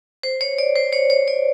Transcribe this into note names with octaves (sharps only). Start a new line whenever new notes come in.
C5
C#5
D5
C5
C#5
C#5
D5